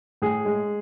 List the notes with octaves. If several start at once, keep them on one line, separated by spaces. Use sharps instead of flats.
A2 G#4
G#3